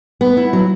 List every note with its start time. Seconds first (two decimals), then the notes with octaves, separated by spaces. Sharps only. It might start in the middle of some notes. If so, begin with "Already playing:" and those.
0.21 B3
0.37 E4
0.53 F#3